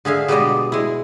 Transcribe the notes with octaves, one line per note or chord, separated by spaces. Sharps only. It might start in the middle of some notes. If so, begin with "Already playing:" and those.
D3 G#4 E5 F5
B2 G3 G#3 B3 D5 D#5
G#3 E4